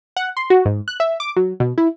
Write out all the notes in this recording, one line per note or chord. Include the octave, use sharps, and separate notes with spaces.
F#5
C6
F#4
G#2
F#6
E5
D6
F#3
B2
E4